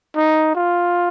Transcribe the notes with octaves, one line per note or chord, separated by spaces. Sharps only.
D#4
F4